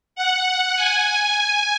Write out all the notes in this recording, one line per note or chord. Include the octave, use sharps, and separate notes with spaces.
F#5
G#5